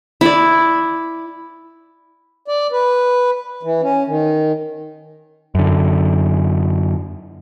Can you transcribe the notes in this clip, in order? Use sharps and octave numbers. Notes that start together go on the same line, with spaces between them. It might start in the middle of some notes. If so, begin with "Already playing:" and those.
E4 D5
D5
B4
E3
C#4
D#3
F#2 D3